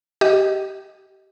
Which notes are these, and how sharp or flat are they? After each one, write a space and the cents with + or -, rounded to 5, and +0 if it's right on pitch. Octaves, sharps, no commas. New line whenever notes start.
G4 -25 D#5 +10